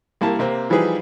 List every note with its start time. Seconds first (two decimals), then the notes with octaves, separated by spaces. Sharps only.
0.21 C2 A#3 E4 A5
0.39 C3 A#3 C4
0.70 E3 F3 G3 D#4 G#4 B4